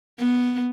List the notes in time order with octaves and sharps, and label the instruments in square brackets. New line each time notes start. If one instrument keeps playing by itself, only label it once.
[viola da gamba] B3